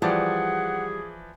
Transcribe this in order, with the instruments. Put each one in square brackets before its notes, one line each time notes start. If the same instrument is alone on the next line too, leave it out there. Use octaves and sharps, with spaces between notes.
[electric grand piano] E3 F3 D5 [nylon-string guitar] G3 A5 [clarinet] G#4 [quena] F#5